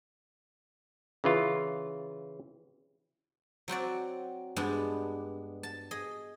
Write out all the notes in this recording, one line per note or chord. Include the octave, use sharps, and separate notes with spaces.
C#3 E3 F4
F#3 C4 F#4 D5
G2 G#3 B3 D4
A5
G#4 D#5